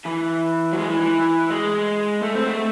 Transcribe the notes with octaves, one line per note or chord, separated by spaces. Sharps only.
E3
F#3
G#3
E3
E3
G#3
A3
C4
A3